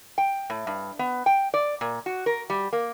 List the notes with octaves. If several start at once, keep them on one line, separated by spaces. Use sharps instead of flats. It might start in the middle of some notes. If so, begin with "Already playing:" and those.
G5
A2
G2
B3
G5
D5
A#2
F#4
A#4
G3
A#3